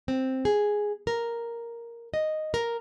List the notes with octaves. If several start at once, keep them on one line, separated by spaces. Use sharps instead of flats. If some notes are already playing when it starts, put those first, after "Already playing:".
C4
G#4
A#4
D#5
A#4